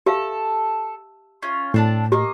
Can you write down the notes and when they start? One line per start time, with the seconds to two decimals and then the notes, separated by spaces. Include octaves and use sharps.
0.06 G4 A4 E5 F5
1.42 C#4 F4
1.74 A2 C4 D4 A5
2.12 A#3 G4 D#5